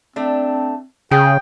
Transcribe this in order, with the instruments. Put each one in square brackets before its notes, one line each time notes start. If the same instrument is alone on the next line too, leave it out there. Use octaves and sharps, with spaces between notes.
[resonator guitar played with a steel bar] A3 D4 [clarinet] C4
[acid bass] C#3 [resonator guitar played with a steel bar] G#4 [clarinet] G5